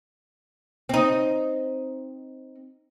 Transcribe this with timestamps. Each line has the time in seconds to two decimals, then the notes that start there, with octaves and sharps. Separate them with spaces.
0.89 C4 D#4